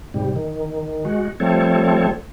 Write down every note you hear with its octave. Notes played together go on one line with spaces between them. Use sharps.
G#2 C3 G3
D#3
G#3 F#4
F3 G3 A3 C4 A4 C#5